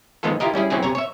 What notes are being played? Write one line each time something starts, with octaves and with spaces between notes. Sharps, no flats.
D#3 F3 G#3 B3 F4 A4
E4 F4 G4 A#4 D#5
G3 C#4 E4 G#4
F#3 C4 C#4 E4 G#4
C3 C#5 G#5 A#5
C#5 E5